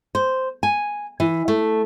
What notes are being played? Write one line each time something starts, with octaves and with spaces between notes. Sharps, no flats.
C5
G#5
E3
A3